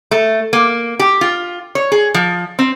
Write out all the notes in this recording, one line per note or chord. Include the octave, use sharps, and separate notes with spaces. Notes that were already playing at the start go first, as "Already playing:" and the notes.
A3
A#3
G4
F4
C#5
G#4
F3
C4